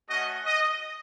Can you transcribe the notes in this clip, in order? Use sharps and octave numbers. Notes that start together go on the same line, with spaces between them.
A3 C#4 F#4 D#5
D#5